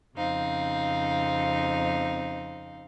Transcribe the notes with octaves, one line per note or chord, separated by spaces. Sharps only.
F2 C#3 C4 D#4 F5